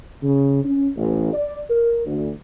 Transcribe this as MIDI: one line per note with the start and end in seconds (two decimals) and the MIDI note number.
0.23 0.61 49
0.64 0.89 61
0.96 1.31 33
1.33 1.59 74
1.69 2.02 70
2.06 2.30 38